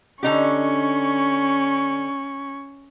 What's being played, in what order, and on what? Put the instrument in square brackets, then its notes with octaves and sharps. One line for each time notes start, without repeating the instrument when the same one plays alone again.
[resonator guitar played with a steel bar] D3 D#4 G4 [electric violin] C#4 C#6